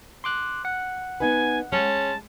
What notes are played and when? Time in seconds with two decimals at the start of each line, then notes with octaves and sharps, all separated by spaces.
0.24 C6 D6 F#6
0.65 F#5
1.20 B3 D#4 B4 G#5
1.72 G#3 C#4 A5